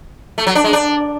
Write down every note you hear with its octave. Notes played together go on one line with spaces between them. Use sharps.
A3
F#3
D4
G#3
D4